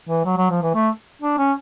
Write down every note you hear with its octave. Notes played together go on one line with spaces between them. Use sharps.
E3
F#3
F#3
F3
E3
A3
D4
C#4